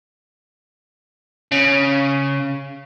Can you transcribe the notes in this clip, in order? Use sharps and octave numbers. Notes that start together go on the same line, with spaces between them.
C#3